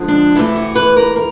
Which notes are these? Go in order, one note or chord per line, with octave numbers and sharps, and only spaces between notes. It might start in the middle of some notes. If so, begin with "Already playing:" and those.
Already playing: D3 F3 G#3
D4
C3 E3 A3 E4
F#4
B4
A#4
A#4